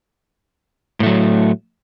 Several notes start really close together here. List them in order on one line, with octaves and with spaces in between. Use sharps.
A2 A3 F#3